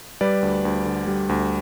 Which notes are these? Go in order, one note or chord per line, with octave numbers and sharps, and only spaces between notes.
G3 B4 D5
D2
D2
D3
G3
D2